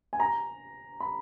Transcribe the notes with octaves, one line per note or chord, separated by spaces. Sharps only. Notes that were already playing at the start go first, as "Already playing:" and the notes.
G#5
A#5
B5